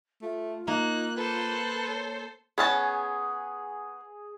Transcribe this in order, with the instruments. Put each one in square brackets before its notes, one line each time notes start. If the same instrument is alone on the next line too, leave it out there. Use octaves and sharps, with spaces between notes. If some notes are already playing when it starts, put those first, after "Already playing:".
[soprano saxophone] A3 [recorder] F4
[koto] A#3 [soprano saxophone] D#4 [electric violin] F#6
[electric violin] A4 C5 [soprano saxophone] B4
[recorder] C#5
[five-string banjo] B3 C#4 A5 [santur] G#4